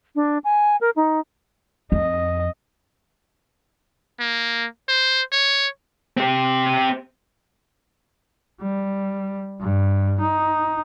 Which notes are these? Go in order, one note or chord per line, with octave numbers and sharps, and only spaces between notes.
D4
G#5
A#4
D#4
F2 D#5
A#3
C5
C#5
C4 G4
G3
G2
D#4